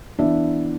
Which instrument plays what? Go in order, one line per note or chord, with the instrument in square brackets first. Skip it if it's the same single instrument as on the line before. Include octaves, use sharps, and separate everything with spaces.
[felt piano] E3 B3 D4 E5